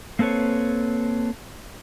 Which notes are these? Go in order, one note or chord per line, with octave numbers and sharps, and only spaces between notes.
A#3 C4 A4 B4 C#5